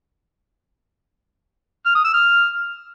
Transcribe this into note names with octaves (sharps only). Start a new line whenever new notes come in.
F6
D#6
E6
F6